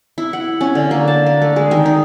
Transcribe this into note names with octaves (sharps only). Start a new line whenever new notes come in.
E4
F#5
C#4
D3
A#3
A5
A#4
A3
G#3
D#3
D#4